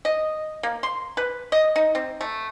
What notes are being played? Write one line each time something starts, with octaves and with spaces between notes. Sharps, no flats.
D#5
A#3
C6
B4
D#5
D#4
C4
A3